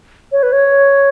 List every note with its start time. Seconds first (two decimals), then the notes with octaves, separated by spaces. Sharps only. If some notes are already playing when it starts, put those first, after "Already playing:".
0.32 C#5
0.42 B4
0.52 C#5